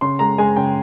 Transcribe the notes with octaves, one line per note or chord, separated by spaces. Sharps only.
C#3 C6
G#3 A#5
G#3 G#5
C#3 G5